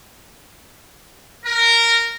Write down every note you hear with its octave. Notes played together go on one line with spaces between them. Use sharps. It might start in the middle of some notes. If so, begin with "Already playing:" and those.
A#4